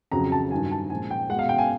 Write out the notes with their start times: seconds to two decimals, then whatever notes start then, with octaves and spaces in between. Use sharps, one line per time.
0.12 F2 C#3 F#3 A#5
0.32 A5
0.51 G2 D#3 F#3 G#5
0.71 A5
0.90 A#2 F3 G#3 G#5
1.11 G5
1.29 G#3 F#5
1.34 B2 F5
1.49 G5
1.58 G#5